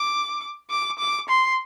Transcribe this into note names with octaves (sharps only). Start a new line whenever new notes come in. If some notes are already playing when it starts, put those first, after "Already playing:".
Already playing: D6
D6
D6
C6